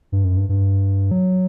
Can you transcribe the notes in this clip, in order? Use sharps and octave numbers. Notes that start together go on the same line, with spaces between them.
G2
F#2
G2
G2
F#3